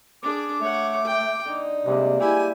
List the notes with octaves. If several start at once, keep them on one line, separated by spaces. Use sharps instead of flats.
D4 G#4 D6
A3 C#5 F#5
G5
D3 D#4
C3 G3 G#3 A#3
E4 G4 G#5